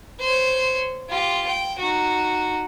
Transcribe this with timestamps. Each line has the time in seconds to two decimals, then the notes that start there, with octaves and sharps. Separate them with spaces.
0.20 C5 C#5
1.09 F4 G4
1.47 G5
1.79 D#4 F#4